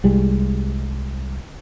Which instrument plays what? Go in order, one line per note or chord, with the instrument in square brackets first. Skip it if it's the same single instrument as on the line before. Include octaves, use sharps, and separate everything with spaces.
[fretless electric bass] C2 G3 G#3